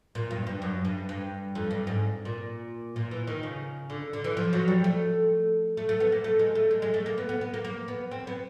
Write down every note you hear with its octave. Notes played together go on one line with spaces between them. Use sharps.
A#2
G2
G2
F#2
G2
G2
F2
G2
G#2
A#2
A#2
E3
D#3
C#3
D3
D3
E3
F3
F#3
G3
A3
A3
A3
B3
A#3
A3
G#3
A3
G#3
G#3
A3
A#3
B3
B3
B3
A#3
A#3
B3
C4
B3